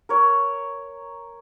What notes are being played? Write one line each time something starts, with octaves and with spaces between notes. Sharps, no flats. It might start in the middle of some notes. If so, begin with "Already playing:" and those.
A#4 C#5